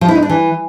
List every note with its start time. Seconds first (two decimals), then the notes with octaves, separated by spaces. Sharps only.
0.01 F3
0.08 E4
0.15 D#4
0.22 D4
0.29 E3